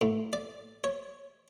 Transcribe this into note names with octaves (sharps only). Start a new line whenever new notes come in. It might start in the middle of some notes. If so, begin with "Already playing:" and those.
A2
D5
C#5